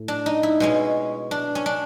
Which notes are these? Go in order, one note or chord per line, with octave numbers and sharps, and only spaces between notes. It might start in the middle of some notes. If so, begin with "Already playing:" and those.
Already playing: A2
D4
D#4
E4
B2 G#3 C#4
D4
C#4
D4